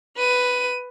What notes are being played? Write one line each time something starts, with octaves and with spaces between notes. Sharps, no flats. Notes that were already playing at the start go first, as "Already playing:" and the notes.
B4 D#7